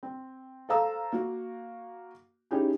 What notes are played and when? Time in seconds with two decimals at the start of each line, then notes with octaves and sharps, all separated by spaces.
0.03 C4
0.69 A4 C5 F5 A#5 E6
1.12 A#3 F#4
2.51 C#4 D#4 E4 G4 G#4